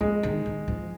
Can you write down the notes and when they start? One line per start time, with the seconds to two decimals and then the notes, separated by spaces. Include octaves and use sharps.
0.01 F3 G#3
0.23 D#3
0.46 D#3
0.68 F3